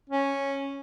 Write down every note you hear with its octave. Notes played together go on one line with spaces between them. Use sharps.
C#4